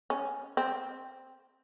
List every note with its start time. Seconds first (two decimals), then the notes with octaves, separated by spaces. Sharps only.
0.10 C#4
0.57 C4